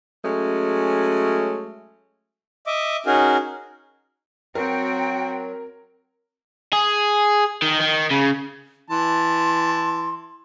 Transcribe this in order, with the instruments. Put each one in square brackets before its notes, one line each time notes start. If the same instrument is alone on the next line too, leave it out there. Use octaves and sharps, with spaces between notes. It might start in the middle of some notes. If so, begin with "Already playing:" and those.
[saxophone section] F#3 G#3 A3 C#4
[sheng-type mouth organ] D#5 E5 D6
C#4 D#4 F#4 G#4 A#4
[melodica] F#3 [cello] C4 F#4 [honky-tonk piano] A#4 [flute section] G5
[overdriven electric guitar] G#4
D#3
D#3
C#3
[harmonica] E3 A5 [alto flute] C6